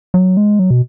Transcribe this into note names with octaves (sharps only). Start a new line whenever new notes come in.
F#3
G#3
F#3
B2